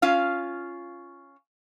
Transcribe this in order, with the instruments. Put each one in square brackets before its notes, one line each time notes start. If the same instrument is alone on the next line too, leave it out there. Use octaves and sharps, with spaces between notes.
[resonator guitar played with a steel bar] C#4 F4 F5